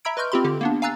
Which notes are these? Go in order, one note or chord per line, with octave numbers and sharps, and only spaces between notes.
E5 A#5 B5 E6 G#6 D7
B4 D#5 C6 C#6 F6 G6
C4 F4 G4 B5 C6
D3 G4
A#3 B3 D4
F5 G#5 A#5 E6 F#6 A6